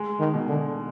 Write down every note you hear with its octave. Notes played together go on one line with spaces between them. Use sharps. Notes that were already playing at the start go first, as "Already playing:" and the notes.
Already playing: G#3
D#3
B2
D3